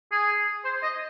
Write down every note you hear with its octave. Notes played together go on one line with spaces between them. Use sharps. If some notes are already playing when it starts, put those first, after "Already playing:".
G#4
C5
D#5